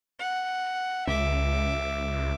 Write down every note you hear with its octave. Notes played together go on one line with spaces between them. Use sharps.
F#5
C#2 E5 D6